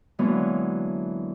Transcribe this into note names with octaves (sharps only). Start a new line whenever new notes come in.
D3 E3 F#3 G#3 A#3 B3